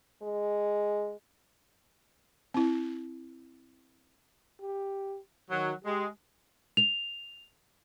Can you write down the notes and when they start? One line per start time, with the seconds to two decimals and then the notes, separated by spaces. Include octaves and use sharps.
0.22 G#3
2.54 C4 E4
4.61 G4
5.50 D#3 F#3
5.85 G#3 G4
6.77 F7